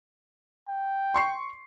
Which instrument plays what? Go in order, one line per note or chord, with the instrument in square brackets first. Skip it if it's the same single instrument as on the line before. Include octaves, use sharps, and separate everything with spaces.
[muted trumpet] G5
[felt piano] C6 C#6 C7